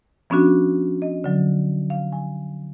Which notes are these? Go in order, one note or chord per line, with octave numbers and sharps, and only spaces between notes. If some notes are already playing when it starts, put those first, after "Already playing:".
F3 B3 C#4 D4 F#4
D#5
D3 F#3
F5
G#5